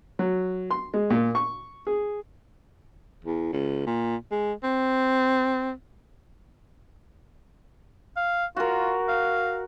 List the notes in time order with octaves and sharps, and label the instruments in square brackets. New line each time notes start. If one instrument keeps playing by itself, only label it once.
[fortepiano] F#3
C6
G#3
A#2
C#6
G#4
[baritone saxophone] E2
C#2
A#2
G#3
C4
[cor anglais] F5
[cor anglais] F4 [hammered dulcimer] F#4 A#4
[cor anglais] F5